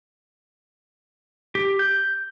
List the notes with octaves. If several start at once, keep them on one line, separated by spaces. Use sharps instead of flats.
G4
G6